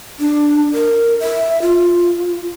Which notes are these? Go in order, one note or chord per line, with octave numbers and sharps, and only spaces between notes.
D4
A#4
E5
F4